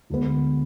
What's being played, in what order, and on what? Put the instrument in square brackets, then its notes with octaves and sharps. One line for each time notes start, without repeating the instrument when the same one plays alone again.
[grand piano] D2 D3 G#3 B3